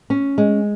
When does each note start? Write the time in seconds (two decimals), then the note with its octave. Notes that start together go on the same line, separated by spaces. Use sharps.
0.10 C#4
0.38 G#3